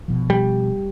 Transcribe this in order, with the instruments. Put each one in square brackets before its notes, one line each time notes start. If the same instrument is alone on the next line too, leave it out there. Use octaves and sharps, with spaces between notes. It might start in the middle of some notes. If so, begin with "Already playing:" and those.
[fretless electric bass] B2 F3
[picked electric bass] G3